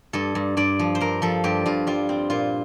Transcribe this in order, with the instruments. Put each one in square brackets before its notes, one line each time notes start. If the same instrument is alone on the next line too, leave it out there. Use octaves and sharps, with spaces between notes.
[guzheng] G2 A4
G2
G2 D5
F3
C5
G2 A#4
F3 A4
G2 G4
G2 F4
G3 F4
C4
A#2 F4